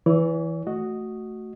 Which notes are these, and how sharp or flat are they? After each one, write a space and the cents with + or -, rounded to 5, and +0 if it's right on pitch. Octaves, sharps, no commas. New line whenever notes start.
E3 +0 C#5 +45
A3 +0 F#4 +0 D#5 +0